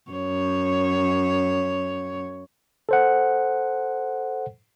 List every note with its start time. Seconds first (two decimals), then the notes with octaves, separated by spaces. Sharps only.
0.11 F#2 C#5
2.89 A4 C5 F#5